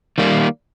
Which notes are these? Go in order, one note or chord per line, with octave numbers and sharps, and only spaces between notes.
D#3 G3 A#3